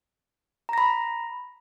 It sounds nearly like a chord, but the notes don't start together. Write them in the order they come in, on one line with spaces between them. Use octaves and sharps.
A#5 A#6 B5